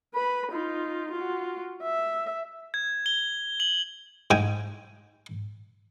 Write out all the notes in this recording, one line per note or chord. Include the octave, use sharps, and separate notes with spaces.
B4 B5
D#4 F4
F4 F#4
E5
G#6
G7
F#7
G#2 G5 G#5